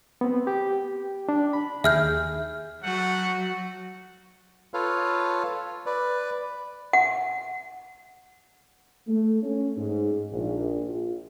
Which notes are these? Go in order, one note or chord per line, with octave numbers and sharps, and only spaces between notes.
B3 C4
G4 G5
D4
B5
D#2 G#4 E5 F6 G6
F#3 A3 F#4 F#5
F4 A4 B4 C#5 F5
B4 D5
F#5
A3
C#4
G#2
A#1
F4